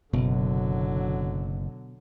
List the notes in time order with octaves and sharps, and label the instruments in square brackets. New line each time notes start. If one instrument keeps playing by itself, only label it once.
[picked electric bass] F#1 [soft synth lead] B2 [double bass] D3 F#3